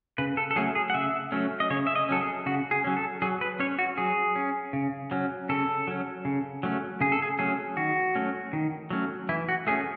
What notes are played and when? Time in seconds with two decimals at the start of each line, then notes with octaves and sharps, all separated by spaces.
0.18 C#3 B4
0.37 A4
0.51 A4
0.56 F#3 A3 C#4 G#4
0.75 G#4
0.90 F#5
0.94 C#3 E5
1.32 F#3 A3 C#4
1.60 D#5
1.70 C#3 C#5
1.87 E5
1.96 D#5
2.09 F#3 C#4 A4
2.21 G#4
2.46 C#3 F#4
2.71 G#4
2.84 F#3 C#4
2.97 A4
3.22 F#3 G#4
3.41 B4
3.60 C#4 C#5
3.79 F#4
3.98 F#3 G#4
4.36 C#4
4.73 C#3
5.11 F#3 C#4
5.49 C#3 A4
5.87 F#3 C#4
6.25 C#3
6.63 F#3 A3 C#4
7.01 C#3 G#4
7.12 A4
7.22 G#4
7.39 F#3 A3 C#4 G#4
7.77 D#3 F#4
8.15 F#3 A3 C#4
8.53 D#3
8.90 F#3 A3 C#4
9.29 E3 E4
9.49 F#4
9.67 A3 C#4 G#4